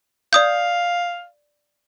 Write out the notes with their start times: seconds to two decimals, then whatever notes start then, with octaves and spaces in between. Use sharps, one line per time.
0.33 D5 F5 D#6 G6